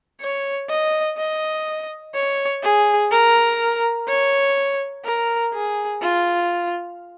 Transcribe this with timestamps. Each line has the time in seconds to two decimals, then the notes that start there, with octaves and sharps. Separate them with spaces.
0.21 C#5
0.69 D#5
1.18 D#5
2.14 C#5
2.63 G#4
3.11 A#4
4.08 C#5
5.05 A#4
5.53 G#4
6.02 F4